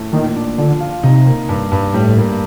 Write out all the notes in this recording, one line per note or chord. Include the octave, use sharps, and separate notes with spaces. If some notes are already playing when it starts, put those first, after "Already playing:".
Already playing: A2
A#2 D#3
D4
D3 F3
F4
C3 D#4
A#3
G2
G2
A2 G3
A#3